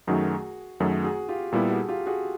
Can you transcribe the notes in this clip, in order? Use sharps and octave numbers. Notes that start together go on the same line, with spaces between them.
F#2 D#3 F#3 A3 F#4 G#4
F#2 D#3 F#3 A3 F#4 G#4
F#4 G#4
F4 G4
A#2 G3 B3 E4 G4 A4
A4
F#4 G#4
F4 G4
F#4 G#4